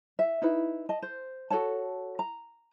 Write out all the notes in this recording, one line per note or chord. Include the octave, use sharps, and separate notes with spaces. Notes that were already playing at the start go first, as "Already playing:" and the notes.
E5
D#4 E4 B4
D#5 A5
C5
F#4 A4 C#5 A5
A#5